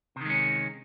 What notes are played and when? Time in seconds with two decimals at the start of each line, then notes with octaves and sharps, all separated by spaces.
0.16 C3
0.21 D#3
0.25 G#3
0.30 C#4